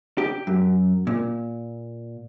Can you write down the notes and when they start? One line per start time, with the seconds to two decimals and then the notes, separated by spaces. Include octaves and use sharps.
0.18 G4
0.47 F#2
1.07 A#2